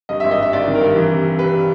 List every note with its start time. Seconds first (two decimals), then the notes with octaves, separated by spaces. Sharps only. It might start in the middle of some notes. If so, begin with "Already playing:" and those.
0.09 G2 D#5
0.20 G#1 E5
0.31 D#5
0.38 G2 E5
0.53 G#1 D5
0.68 D#3
0.75 A#4
0.81 G2
0.96 E3
1.11 C3
1.24 C3
1.39 G3 B4
1.54 G3